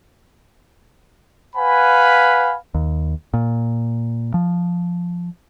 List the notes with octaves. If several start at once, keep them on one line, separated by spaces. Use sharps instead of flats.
B4 F5 F#5 G#5 B5
D#2
A#2
F3